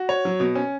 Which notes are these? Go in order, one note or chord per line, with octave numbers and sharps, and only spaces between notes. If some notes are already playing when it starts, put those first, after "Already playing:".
Already playing: F#4
C#5
F#3
B2
C#4